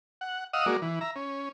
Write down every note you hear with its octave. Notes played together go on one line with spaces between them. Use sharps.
F#5
D#5 F5 F#5 D#6 E6
G#3 A#3 F#4 D5
E3
E5 A#5
C#4